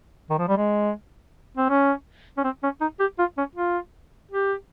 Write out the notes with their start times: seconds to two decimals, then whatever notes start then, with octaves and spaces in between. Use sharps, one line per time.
0.30 D#3
0.38 F3
0.48 G3
0.57 G#3
1.57 C4
1.70 C#4
2.38 C#4
2.44 C4
2.63 C#4
2.81 D#4
3.00 G4
3.19 F4
3.38 C#4
3.56 F4
4.31 G4